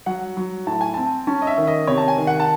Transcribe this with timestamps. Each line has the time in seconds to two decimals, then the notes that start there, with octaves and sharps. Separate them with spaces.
0.06 F#3 F#5
0.37 F#3
0.67 A2 A5
0.81 G#5
0.94 C4 A5
1.27 C#4 A5
1.42 D#5
1.47 E5
1.58 D#3
1.67 D#5
1.87 C3 C#5
1.98 A5
2.08 G#5
2.18 D#3
2.27 F#5
2.40 A5